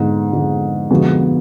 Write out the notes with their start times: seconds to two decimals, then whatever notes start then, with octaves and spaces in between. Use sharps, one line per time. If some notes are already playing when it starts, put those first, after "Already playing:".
Already playing: F2 G#2 D3 F3 G#3 B3
0.31 F2 D3 F3 G#3 B3
0.91 F2 B2 D3 F3 G#3 B3